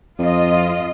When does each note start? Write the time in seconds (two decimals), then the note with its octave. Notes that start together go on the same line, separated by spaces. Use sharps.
0.19 F2 F4 D#5